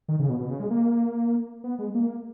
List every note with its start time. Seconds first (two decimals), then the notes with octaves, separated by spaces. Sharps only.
0.08 D#3
0.19 C#3
0.29 B2
0.40 B2
0.50 C#3
0.60 G#3
0.70 A#3
1.64 B3
1.79 G#3
1.95 A#3